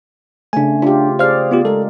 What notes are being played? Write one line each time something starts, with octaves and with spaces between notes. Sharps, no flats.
C#3 A3 D4 G#5
D4 F4 G4
G#4 C5 D5 F5 F6
B3 F4 G4
G#3 A4 A#4